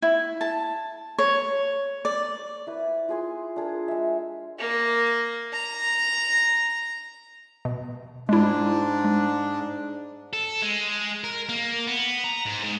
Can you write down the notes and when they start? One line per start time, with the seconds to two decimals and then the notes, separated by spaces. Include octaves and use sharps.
0.02 E4
0.41 A5
1.18 C#5
2.05 D5
2.67 E4 B4
3.09 F4 G#4 C6
3.56 D4 G#4 A#4
3.88 G#3 E5
4.59 A#3
5.53 A#5
7.65 B2
8.29 G#2 G#3 D4 E4
9.04 G#3
10.33 A4
10.62 G#3
11.24 A#4
11.49 A#3
11.87 B3
12.24 A#5
12.46 G#2
12.63 G#2